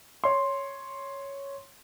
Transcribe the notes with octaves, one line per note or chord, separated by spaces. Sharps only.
C#5 C6